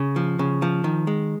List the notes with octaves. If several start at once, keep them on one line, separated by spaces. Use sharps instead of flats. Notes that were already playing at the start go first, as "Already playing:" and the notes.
Already playing: C#3
F3
C#3
F3
D#3
G#3